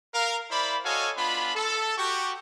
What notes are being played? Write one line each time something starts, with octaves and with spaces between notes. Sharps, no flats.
A#4 F5
E4 C5 D5 B5
F#4 A4 C#5 D#5 F5 G#5
B3 D4 F4 B5
A4
F#4 G4 C#6